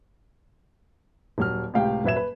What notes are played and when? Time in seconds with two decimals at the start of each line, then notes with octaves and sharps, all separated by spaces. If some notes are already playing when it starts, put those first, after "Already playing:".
1.38 D#1 F#3 F6
1.74 C#2 A2 C3 F5 G5
2.04 D#1 F#3 B4 E5 G#6 E7
2.17 B4